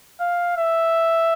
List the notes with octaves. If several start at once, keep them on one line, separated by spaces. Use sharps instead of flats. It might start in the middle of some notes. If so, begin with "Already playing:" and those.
F5
E5